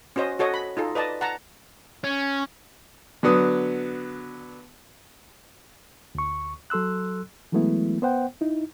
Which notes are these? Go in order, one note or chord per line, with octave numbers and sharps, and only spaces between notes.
C#4 F#4 C5 D#5
F#4 A4 C#5 D#5
B5
D#4 F4 A4
B4 D5 D#5 A5
F#5 A5 A#5
C#4
D3 F#3 B3 D#6
D2 C#6
F#3 A4 C6 E6 F#6
E3 F#3 G#3 A3 B3 E4
B3 C5 F#5 G5
D#4 E4